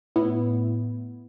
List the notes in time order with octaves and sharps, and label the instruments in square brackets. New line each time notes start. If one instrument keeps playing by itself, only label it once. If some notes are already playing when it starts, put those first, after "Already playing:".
[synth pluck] A2 B3 E4